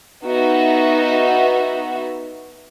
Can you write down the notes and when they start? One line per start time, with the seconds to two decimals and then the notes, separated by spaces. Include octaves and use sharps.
0.24 B3 D#4 F#4 E5